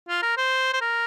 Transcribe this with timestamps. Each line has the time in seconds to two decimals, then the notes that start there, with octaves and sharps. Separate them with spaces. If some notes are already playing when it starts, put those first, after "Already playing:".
0.09 F4
0.23 A#4
0.37 C5
0.73 C5
0.81 A#4